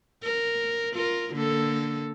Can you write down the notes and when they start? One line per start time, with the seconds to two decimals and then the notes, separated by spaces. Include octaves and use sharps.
0.23 A#4
0.93 F4 A#4
1.33 D3 A#3 A4